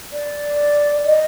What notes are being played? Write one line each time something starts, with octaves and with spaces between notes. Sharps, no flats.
D5
D#5